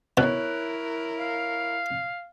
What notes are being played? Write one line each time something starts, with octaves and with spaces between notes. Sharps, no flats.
B2 E4 A#4 C#5 F#6
F5